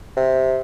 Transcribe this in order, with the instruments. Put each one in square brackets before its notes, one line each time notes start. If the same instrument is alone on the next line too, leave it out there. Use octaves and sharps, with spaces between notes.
[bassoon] C3